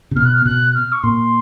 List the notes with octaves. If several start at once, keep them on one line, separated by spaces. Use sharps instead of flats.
C3
B2 F6
F#6
F6
B2 F#6
F6
C#6
A#2 C6